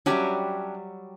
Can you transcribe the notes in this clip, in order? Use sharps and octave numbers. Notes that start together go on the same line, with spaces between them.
F#3 G3 C#4 D4 G4 E5